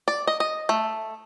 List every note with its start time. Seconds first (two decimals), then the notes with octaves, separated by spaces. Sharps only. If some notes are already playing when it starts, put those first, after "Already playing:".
0.08 D5
0.27 D#5
0.40 D#5
0.69 A3